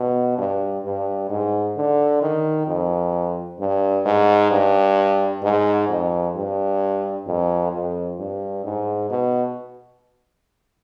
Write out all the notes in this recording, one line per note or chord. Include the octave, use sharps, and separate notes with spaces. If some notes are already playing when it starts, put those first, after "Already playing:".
Already playing: B2
G2
G2
G#2
D3
D#3
F2
G2
G#2
G2
G#2
F2
G2
F2
F2
G2
G#2
B2